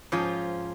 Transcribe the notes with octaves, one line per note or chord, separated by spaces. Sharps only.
G#2 F3 C#4 F4